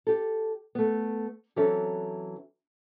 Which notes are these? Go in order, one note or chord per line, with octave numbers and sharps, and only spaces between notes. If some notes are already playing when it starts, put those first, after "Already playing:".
G4 A4
A3 B3
E3 F#3 C4 C#4 A4